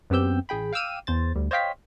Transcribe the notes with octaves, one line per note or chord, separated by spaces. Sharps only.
F#2 B3 C4 G4 E6 G6
A1 G#4 G5 B5
F5 G5 D6 E6 F6 D#7
E2 C5 A6
D2 G3
C5 C#5 D#5 F5 G5 B6